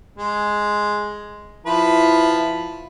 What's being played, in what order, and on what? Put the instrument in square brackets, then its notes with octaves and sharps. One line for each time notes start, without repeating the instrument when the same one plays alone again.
[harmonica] G#3
[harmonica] F3 B4 [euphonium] E4